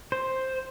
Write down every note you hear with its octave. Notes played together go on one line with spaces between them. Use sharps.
C5